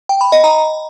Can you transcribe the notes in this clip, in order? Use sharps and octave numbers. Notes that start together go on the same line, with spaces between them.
G5
B5
D#5
A#5